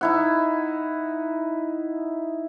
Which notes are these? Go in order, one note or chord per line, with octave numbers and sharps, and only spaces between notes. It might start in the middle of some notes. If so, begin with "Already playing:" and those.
D#4 E4 F#5